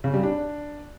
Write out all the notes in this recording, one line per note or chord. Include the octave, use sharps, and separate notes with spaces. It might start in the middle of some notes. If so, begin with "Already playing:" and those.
C#3
G3
D4